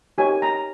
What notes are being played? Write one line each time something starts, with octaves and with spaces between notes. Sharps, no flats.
D#4 G4 A#4 C#5 G#5
A#5